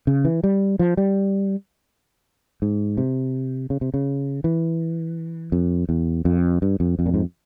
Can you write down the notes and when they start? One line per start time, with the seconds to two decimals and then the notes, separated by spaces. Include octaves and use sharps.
0.07 C#3
0.25 E3
0.44 G3
0.79 F3
0.97 G3
2.62 G#2
2.97 C3
3.70 C#3
3.81 C3
3.94 C#3
4.44 E3
5.52 F2
5.89 E2
6.25 F2
6.62 G2
6.80 F2
6.99 F2
7.06 A#2
7.14 G#2